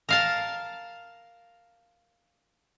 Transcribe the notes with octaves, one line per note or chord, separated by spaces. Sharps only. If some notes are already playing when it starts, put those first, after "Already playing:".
A#4 F5 A5